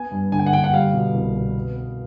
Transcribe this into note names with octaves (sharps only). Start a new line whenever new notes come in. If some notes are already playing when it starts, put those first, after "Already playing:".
Already playing: B3 G#5
G2
D3 G#5
G5
F#5
D3 G5
F#5
G3 F5
B2
C2
B2
B3
B3